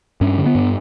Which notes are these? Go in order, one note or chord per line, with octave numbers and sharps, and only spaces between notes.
G2 C#4
D3
B3
G2